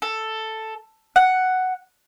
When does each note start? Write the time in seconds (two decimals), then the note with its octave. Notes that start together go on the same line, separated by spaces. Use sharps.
0.02 A4
1.16 F#5